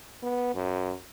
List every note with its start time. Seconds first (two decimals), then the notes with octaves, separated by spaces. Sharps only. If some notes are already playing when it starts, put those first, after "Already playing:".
0.23 B3
0.55 F#2